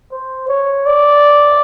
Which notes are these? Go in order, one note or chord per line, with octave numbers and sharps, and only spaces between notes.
C5
C#5
D5